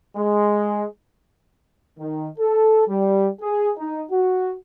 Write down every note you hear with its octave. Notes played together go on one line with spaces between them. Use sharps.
G#3
D#3
A4
G3
G#4
D#4
F#4